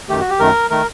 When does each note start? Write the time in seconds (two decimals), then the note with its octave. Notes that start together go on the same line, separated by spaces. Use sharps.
0.09 F#2 D#3 A3 G4
0.19 F#4
0.30 G4
0.40 F#2 D#3 A3 A#4
0.70 D#3 A3 A#4